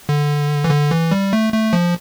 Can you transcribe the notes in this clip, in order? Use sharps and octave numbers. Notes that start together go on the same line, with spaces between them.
D3
E3
D3
E3
G3
A3
A3
F3